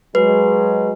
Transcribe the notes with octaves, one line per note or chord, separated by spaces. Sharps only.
F#3 G#3 B4